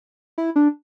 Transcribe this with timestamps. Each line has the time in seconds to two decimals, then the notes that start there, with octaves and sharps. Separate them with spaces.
0.38 E4
0.56 D4